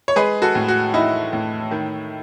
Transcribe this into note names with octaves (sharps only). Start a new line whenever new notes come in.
C#5
G#3 G#4 B4
F#4 A4
A2
F#4
D#4 E4
A2
D#3